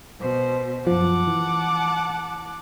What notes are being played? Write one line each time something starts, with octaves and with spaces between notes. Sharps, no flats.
B2 C5
F#2 F3 F#5 A5 D6
E3